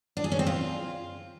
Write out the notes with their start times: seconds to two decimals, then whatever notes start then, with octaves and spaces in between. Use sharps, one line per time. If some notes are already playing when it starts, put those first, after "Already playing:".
0.17 D4
0.24 G#4
0.32 C#4
0.39 C4
0.47 F4